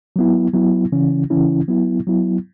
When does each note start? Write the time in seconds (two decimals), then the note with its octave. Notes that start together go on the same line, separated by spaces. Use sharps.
0.16 F#3 B3 E4
0.53 F#3 B3 E4
0.92 C#3 E3 C#4 E4
1.30 C#3 E3 C#4 E4
1.68 F#3 B3 E4
2.07 F#3 B3 E4